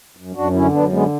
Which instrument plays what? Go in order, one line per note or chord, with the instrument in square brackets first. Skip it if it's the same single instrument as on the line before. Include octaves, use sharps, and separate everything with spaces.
[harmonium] F#2
F#2 D4 F#4
D3 C#4 E4
F#2 B3 D4
D3 G#3 B3